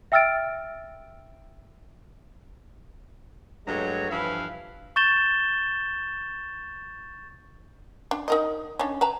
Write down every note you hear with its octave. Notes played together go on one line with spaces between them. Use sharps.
E5 G5 E6 F6 A6 D7
G2 F#3 G#3 A3 C#5 A#5
G2 E3 F3 E4 B4 F5
C#6 G6 A6 E7 G7
D4
D#4 A#4 D#5
C#4 D4
B4 A5 A#5